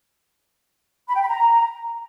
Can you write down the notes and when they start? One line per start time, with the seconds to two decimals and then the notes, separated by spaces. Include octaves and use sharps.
1.08 B5
1.15 G5
1.22 B5
1.29 A#5